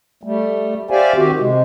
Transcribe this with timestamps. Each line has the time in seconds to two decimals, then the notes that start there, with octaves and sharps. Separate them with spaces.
0.23 G3 A3
0.90 G4 C5 D5 E5 F5 G#5
1.16 D#3 C4 F#4 G4
1.40 C3 G#3